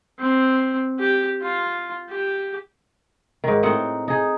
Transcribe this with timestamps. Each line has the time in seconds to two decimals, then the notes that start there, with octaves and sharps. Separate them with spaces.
0.19 C4
0.99 G4
1.42 F4
2.10 G4
3.44 G#2 D#3
3.63 A2 C4 D#4 F#5
4.08 D#4 G#4